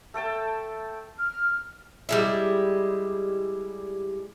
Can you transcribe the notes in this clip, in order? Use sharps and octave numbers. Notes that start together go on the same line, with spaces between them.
A3 A4 G5 A5
F6
G3 G#3 E4